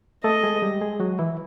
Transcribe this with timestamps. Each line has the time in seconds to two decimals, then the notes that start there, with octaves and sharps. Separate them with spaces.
0.24 A3 A4 D#5
0.43 G#3 G#4
0.62 G3 G4
0.81 G#3 G#4
1.00 F#3 F#4
1.19 E3 E4